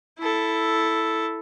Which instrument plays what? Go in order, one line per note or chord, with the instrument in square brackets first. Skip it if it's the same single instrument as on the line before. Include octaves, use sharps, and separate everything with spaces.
[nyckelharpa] E4 A4